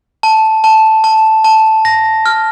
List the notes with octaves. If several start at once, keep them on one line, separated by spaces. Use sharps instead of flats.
A5
A5
A5
A5
A#6
F6